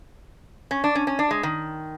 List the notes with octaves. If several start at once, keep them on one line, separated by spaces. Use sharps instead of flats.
C#4
D4
C#4
C#4
D4
G#3
D#3